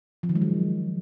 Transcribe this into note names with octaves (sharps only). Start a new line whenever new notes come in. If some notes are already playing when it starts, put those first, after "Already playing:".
F3
D#3
G#3
F#3